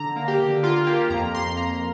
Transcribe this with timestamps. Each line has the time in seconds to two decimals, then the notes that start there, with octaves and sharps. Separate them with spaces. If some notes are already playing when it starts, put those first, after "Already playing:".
Already playing: D3 A#5
0.16 A#3
0.28 G4
0.39 D3
0.63 A#3 F4
0.87 A#3 G4
1.10 F2 A#5
1.34 F2 C6
1.57 A#3 A#5